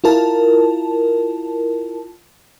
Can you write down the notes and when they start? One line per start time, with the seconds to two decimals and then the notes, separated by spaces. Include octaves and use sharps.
0.04 E4 F4 A#4 A5